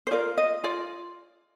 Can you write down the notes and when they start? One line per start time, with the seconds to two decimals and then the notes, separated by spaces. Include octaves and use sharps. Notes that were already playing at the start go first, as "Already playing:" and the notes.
0.07 C5
0.11 F4 A#4 D5
0.38 D#5
0.64 F4 D5